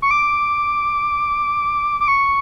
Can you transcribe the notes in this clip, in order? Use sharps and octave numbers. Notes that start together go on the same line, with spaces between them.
C#6
D6
D6
C#6